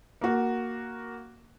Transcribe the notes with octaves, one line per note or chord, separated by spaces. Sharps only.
A#3 F#4